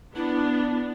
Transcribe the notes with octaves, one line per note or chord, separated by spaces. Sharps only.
B3 D4 E4